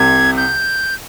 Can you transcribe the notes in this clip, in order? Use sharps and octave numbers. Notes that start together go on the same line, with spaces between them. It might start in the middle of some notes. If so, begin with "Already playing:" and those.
Already playing: C2 C3 G#6
G6